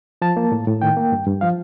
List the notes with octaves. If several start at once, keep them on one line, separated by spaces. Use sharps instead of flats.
F3 A5
A#3
A2
A2
D#3 G5
A#3
G2
G2
F3 F5